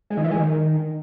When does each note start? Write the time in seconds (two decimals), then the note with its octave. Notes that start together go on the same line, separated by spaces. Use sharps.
0.10 G#3
0.17 D#3
0.24 E3
0.31 G#3
0.38 D#3